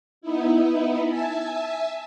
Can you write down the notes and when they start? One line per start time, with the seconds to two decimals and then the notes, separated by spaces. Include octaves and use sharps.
0.21 B3 D#4 E4
1.08 E5 G#5 A5 E6